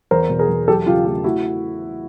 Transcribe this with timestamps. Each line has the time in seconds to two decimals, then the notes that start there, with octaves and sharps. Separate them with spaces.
0.11 E2 A#4 C5
0.30 B2
0.39 G#4 A#4
0.49 E2
0.68 F#3 G4 A4
0.86 C#3 F4 G4
1.05 A3 F4 G4
1.24 A3 E4 F#4